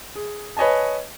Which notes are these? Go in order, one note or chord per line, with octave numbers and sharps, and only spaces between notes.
G#4
B4 C#5 D#5 G#5 A5